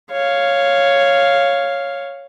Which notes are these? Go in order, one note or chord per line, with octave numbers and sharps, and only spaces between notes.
C#5 F5